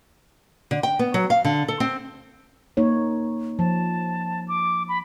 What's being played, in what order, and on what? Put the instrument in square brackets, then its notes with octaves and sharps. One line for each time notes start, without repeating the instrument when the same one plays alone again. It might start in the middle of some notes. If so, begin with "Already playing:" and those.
[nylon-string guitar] D3
G5
B3
F#3
F5
D3
A4
C4
[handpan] A#3 D#4 C#5
[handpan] F3 [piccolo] A5
[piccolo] D6
B5